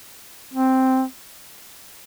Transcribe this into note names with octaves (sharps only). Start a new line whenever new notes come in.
C4